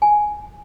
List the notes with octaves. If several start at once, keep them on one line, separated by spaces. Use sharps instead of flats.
G#5